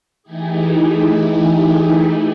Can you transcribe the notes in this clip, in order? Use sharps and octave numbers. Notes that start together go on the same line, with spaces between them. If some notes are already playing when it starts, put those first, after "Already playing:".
E3 A3 D#4 E4 G4 G#4